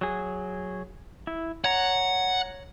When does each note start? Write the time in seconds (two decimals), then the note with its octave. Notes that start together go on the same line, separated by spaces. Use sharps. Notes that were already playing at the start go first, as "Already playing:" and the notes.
0.01 F#3 G#4
1.27 E4
1.64 C#5 F#5 A#5